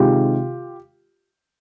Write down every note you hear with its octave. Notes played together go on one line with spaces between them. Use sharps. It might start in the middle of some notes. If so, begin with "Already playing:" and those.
Already playing: C3 D#3 G#3 F4 G4